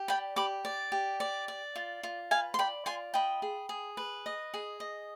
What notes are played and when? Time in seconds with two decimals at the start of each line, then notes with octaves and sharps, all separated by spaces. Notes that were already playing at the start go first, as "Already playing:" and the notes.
Already playing: G4
0.08 D5 G5 B5
0.36 G4 B5 D6
0.65 D5
0.92 G4
1.20 D5
1.48 D5
1.76 F4
2.03 F4
2.31 B4 F5 G#5
2.54 C6
2.59 D5 G5 B5
2.86 F4 G#5 C6
3.14 D#5 G5 B5
3.42 G#4
3.69 G#4
3.97 B4
4.26 D#5
4.54 G#4
4.80 D#5